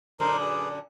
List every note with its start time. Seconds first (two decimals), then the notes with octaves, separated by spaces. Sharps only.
0.20 F#2 A#2 D3 D#4 A#4 C5
0.41 G#4 B4